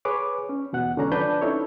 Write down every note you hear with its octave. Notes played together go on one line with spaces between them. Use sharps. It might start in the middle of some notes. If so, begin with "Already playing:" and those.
G#4 B4 C#5 D6
C#4
E2 B2 F#5 F#6
E2 D3 G#3 C#4 D4 A#5
F3 D4 B4 G6
C4 C#4 D#4 E4 A4 C#5